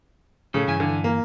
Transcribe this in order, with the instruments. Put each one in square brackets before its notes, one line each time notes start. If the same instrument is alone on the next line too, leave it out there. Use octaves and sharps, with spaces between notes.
[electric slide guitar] A2 A4 [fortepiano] C#3
[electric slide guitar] G2 E3 G#5
[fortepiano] D3
A#3